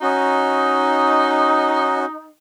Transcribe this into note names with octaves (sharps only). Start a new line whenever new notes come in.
C#4 D#4 F#4